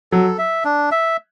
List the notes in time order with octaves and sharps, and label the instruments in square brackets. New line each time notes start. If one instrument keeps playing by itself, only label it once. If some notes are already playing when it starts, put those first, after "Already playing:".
[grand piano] F#3 [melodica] A4
[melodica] E5
D4
E5